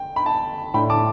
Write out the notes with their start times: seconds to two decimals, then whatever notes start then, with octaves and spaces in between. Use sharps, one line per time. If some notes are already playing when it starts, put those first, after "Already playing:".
Already playing: G5
0.16 B5
0.26 A5
0.74 A2 A3 D4 G5 B5
0.90 A5 D6